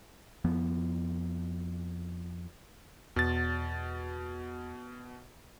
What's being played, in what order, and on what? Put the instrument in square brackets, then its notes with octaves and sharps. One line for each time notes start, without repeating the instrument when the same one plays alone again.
[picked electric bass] F2 F3 B3
[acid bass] E2 [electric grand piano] B2 A6